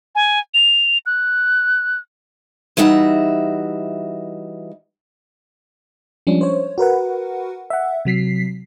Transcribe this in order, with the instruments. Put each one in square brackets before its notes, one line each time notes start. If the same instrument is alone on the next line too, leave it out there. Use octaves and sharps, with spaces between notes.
[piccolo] G#5
F7
F#6
[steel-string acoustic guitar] E3 G3 D#4 F#4 E5
[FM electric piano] F3 G3 G#3 C#4 D4
C5 C#5
F#4 A#4 B4 F#5
E5 F#5
C3 F#3 B6 C7